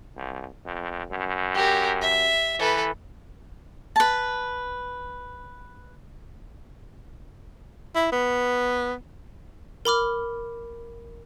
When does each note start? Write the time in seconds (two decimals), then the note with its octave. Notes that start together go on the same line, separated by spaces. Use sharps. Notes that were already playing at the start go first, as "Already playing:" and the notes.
0.16 C2
0.65 F2
1.12 F#2
1.55 G4 A#4
2.02 E5
2.59 E3 A4 B4
3.96 B4 A5
7.95 E4
8.12 B3
9.85 A#4 B5 D6 F6